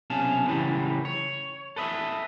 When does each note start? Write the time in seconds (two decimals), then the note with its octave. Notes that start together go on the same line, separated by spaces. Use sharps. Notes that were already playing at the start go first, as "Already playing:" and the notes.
0.10 B1 C3 C#4 F5 A5
0.47 A2 C#3 E3 F#3 G3
1.05 C#5
1.76 A4 B4 D#5 E5